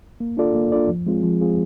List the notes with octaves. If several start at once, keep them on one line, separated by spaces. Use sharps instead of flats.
A#3
D4 F4 A4 D5
A#3
D4 F4 A4 D5
F3
G#3 C4 F4 G#4
F3
G#3 C4 F4 G#4